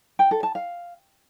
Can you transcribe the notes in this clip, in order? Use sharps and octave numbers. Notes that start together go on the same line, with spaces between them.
G5
A4
A5
F5